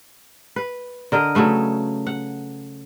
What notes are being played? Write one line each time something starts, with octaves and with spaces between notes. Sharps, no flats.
B4
D3 A#4 D#5
C#3 F#3 A3 B4
F#5